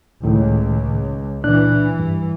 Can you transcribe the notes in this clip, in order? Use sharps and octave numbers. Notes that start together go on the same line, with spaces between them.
C#2 A2 D#3
A#2 E3 D4 F#6
G2